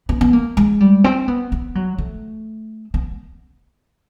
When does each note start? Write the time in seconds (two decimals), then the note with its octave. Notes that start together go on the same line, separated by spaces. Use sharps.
0.09 B3
0.21 B3
0.33 A#3
0.57 G#3
0.80 G3
1.04 C4
1.28 B3
1.52 B3
1.75 F#3
1.98 A3
2.94 B3